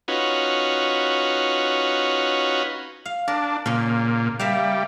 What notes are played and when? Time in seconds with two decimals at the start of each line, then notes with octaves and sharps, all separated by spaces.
0.08 C#4 D#4 F4 F#4 B4
3.06 F5
3.28 D4 A#4
3.66 A#2 C#3 C#4
4.39 G3 A#4 E5 F5